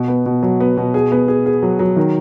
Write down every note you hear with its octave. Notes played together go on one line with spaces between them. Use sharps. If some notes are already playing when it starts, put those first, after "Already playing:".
Already playing: B2
B3
B2
F#3
B3
B2
G#4
B3
G#4
G#4
F#3
F#3
D#3